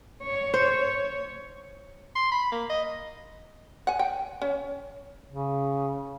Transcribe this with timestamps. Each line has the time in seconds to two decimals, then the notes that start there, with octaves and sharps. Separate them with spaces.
0.23 C#5
0.54 C5
2.15 C6
2.32 B5
2.52 A#3
2.70 D#5
3.87 F#5 G#5
3.99 G5
4.42 C#4
5.29 C#3